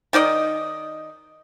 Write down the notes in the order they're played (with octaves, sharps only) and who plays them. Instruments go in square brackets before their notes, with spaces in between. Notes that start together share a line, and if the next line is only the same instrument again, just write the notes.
[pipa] D#3 D#4 D5 D#5